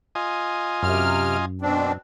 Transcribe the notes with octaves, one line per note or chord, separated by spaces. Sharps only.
F4 D#5 G#5
F#2 C3 F6
B2 C4 D4